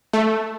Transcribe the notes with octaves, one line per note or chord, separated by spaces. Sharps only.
A3